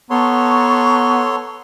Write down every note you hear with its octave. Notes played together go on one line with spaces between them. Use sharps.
B3 A4 C#5 A5 A#5 C6 C#6